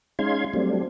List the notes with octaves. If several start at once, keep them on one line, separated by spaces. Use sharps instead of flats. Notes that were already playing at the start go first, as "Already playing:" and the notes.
G#3 C#4 D#4 F5 C6 G#6
F#3 G3 A3 C4 D4